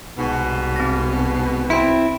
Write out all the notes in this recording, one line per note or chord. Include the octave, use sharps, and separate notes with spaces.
C2 G#2 B2
C4 A#6
C4 E4 B5 C6 D7